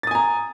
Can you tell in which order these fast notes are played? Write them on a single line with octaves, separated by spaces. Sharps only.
A6 D#6 G#5 A#5